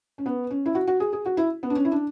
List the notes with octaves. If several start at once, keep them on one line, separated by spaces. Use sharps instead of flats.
C#4
B3
C#4
E4
F#4
F#4
G#4
G#4
F#4
E4
B3
D4
C#4
E4
D4